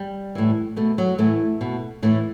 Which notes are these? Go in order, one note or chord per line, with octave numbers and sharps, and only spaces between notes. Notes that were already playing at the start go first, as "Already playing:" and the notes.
Already playing: G3
A2 E3
B2 A3
F#3
A2 E3 A3
B2
A2 E3 A3